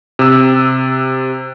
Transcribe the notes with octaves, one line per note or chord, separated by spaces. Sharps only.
C3 E6